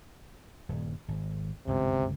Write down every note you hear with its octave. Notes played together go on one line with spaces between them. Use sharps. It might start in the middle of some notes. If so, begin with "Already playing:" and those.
D#1 G2
G#1
G1 C#2 F#2 C3